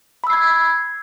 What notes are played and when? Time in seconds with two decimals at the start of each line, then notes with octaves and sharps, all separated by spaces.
0.24 B5
0.27 E6
0.30 C7
0.33 G#6